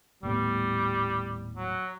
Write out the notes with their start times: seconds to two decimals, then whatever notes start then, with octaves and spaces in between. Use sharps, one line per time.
0.23 D#1 A2 G3 B3
1.56 F#3